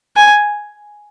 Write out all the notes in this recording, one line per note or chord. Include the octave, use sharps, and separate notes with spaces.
G#5